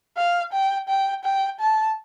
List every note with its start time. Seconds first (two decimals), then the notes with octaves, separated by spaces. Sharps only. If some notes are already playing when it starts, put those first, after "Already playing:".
0.17 F5
0.53 G5
0.89 G5
1.24 G5
1.60 A5